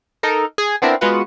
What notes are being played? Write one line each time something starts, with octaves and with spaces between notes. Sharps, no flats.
D#4 A4 A#4
G#4
B3 C4 D4 E4 A#4
G#3 B3 F4 F#4 B4 F#5